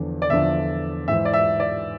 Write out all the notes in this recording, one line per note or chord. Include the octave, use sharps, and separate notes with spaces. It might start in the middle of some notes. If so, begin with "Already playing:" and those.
Already playing: E2 D3 F3
D5
E2 D3 F3 E5
G#2 E3 E5
D5
E5
D5